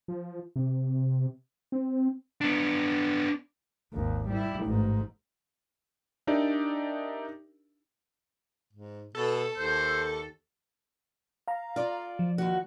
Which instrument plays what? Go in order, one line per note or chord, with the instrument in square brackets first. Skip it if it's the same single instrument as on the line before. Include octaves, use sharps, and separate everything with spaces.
[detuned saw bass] F3
C3
C4
[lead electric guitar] B3 D4
[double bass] G#1 D#2
G3 E4
A1 G#2
[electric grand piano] D4 D#4 G4 A#4 D5 E5
[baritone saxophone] G#2
[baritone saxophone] B2 [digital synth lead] A4
[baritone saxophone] D#2 [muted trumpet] C5
[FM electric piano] F5 A#5
[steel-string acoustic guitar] F4 D5
[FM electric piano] F3
[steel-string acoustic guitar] D#2 F#4